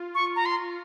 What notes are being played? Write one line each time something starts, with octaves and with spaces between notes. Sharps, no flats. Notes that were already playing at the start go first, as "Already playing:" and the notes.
Already playing: F4
C#6
A#5
C6